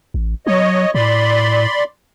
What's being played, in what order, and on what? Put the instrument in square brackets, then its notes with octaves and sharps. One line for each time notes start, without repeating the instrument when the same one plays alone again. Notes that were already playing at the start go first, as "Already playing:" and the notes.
[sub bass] A1
[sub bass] F#3 [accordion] C#5 D#5
[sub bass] A2 [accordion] D5 B5 C6